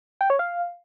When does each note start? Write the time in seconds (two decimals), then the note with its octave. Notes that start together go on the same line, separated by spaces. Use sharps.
0.21 G5
0.30 C#5
0.39 F5